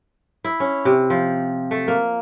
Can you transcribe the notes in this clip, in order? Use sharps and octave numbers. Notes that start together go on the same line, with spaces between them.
E4
C#4
C3
F3
A3
A#3